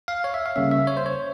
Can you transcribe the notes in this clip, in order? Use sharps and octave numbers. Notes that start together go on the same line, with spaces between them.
F5
C#5
E5
F5
C#3 G3 A#3 C#4 E5
E5
C#5
C5
C#5